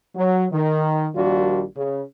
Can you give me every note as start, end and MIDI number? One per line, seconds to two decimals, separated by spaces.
0.15 0.46 54
0.52 1.08 51
1.15 1.63 34
1.15 1.63 51
1.15 1.63 55
1.15 1.63 62
1.15 1.63 65
1.15 1.63 66
1.76 2.02 49